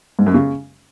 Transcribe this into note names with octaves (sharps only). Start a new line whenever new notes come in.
G#2
F#2
C#3